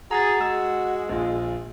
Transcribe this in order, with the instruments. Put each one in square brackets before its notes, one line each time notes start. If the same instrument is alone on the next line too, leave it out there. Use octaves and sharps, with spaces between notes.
[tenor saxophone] F#4 [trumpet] G#4 [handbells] A#5 A6
[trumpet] G#3 [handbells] E6
[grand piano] A#1 F4